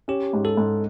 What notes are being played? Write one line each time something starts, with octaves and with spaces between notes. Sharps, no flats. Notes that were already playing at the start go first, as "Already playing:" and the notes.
C#4 G4
G#2
A4
G#2